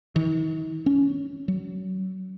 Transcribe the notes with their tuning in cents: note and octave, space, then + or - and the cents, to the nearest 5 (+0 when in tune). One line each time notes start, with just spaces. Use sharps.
D#3 +45
C#4 +15
F#3 +25